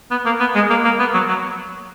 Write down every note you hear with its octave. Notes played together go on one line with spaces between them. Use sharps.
B3
A#3
B3
G#3
A#3
A#3
B3
F#3
F#3